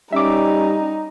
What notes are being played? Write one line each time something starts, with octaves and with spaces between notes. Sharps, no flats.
G3 C#4 D#4 E5 D6